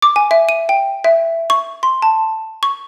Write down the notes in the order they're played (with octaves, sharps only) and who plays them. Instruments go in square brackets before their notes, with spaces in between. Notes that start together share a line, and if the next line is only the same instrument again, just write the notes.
[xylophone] D6
G#5
E5
D#7
G5
E5
C#6
C6
A5
C#6